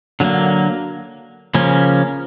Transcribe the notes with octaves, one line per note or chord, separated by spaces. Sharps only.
D3 F#3 A#3
C#3 F3 A#3 C#4